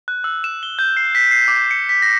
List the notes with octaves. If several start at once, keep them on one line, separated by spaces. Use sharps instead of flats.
F#6
E6
E7
G7
G6
C7
B6
C7
D6
C#7
B6
A#6